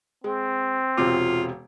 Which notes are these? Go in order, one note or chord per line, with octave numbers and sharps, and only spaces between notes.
G#3 C4
E1 C3 F4 D6